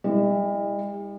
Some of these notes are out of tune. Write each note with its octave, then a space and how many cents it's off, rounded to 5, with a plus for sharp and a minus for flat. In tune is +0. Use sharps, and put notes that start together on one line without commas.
G3 +45 E4 -25